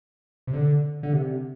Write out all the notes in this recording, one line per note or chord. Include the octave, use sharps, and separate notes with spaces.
C3
D3
D3
C3